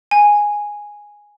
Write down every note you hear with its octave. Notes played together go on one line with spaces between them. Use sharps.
G#5